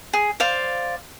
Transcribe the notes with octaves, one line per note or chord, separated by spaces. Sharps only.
G#4
C5 D5 F5